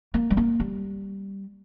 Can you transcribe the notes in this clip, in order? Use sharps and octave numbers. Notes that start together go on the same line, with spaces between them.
A#3
G3
A#3
G3